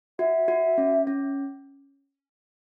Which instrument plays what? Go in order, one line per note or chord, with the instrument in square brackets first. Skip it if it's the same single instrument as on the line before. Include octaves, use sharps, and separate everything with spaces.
[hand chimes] F#4 [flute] E5
[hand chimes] F#4
C#4
C#4